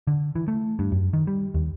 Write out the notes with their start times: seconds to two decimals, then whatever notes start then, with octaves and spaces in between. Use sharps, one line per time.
0.07 D3
0.35 E3
0.48 A3
0.79 G2
0.92 F#2
1.13 D#3
1.27 G3
1.54 D#2